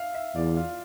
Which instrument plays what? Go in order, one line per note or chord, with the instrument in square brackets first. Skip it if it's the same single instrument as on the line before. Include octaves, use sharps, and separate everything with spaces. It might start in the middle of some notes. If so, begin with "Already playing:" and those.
Already playing: [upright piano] E5 F5
E5
[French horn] E2 [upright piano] D5
[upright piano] F4